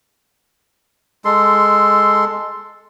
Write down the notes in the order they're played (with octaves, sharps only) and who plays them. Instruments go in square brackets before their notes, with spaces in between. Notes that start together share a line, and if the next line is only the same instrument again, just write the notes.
[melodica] G#3 A4 C6